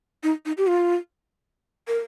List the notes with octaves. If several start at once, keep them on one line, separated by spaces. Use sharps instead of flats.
D#4
D#4
G4
F4
A#4